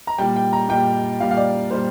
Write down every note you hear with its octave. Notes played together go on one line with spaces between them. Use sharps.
A#5
A#2 G3 G5
G5
A#5
A#2 G3 G5
A#2 G3 F5
F5
D5
A#2 G3 C5